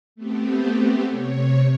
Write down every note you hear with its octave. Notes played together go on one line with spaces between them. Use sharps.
A3 B3 C4 G4
C3 C#5